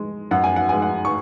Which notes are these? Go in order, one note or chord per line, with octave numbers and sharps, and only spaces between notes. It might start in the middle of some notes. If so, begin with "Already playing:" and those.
Already playing: G#3
F#2 F#5
G#5
F#5
G#3 G#5
F#5
C#6